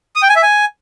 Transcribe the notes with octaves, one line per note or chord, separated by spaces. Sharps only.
D#6
G5
G#5
E5
G#5